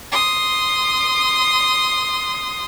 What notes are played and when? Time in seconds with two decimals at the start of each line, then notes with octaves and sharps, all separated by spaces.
0.12 C6 D#6